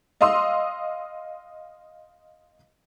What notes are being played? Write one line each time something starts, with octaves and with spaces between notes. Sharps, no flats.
D#5 F5 C6 D#6 E6